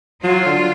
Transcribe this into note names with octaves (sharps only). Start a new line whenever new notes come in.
F#3 F4
D3